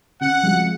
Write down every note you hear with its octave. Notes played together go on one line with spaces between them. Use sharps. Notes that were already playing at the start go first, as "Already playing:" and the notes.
C#3 F#5
F3 G#3 C4 F#4